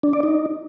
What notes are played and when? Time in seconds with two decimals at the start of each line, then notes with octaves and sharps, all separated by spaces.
0.03 D4
0.13 D5
0.23 D#4